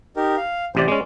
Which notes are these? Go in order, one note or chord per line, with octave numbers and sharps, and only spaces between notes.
D#4 G4 A#4
F5
A1 C3 C5 D5
G#3 C#4 D5